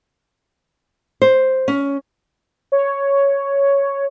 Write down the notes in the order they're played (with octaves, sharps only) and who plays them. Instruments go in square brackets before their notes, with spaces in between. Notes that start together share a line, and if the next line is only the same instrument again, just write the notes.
[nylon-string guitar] C5
C#4
[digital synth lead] C#5